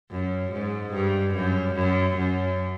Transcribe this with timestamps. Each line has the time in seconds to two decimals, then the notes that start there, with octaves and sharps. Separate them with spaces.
0.11 F#2
0.52 G#2
0.94 G2
1.34 F#2
1.76 F#2
2.17 F#2